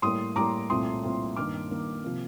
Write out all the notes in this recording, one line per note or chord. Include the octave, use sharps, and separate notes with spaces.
A2 G3 A#3 C6 D#6
A2 G3 A#3 A#5 D6
C2 A#2 A3 C4 C6 D#6
C2 A#2 A3 C4
G2 D#3 A#3 D6 F6
G2 D#3 A#3
C3 F3 A#3